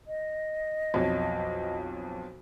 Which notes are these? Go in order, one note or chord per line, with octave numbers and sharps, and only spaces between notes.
D#5
B1 F2 C#5